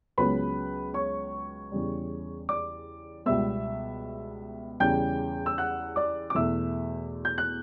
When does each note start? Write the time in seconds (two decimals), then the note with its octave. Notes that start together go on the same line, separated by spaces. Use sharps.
0.18 C#2 C#3 F#3 B3 B4 B5
0.94 C#5 C#6
1.72 E2 C#3 G3
2.49 D5 D6
3.26 C#2 B2 G3 B3 E5 E6
4.80 E2 C#3 G3 G5 G6
5.46 E6
5.58 F#5 F#6
5.96 D5 D6
6.30 D6
6.35 E2 B2 A3 E5 E6
7.25 G6
7.38 F#6